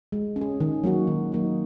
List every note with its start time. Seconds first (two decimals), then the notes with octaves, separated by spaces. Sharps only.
0.12 G#3
0.36 C#4
0.41 G#4
0.60 D#3
0.84 F#3 A#3 D#4 F#4
1.07 D#3
1.32 F#3 A#3 D#4 F#4